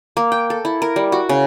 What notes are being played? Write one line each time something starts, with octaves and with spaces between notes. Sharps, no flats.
A#3
G5
A4
E4
A#4
G3
F#4
C#3